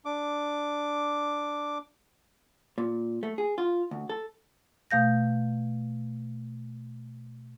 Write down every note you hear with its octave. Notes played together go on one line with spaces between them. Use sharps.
D4 D6
A#2
A3
G#4
F4
D2
A4
B2 A3 F5 G6 A#6